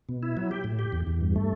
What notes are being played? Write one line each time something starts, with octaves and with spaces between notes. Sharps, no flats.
B2
E4
F#3
G4
A2
G4
E2
E2
G2
A3